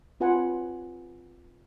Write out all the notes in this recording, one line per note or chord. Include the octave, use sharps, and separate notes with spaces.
C4 F4 B4 F#5 G#5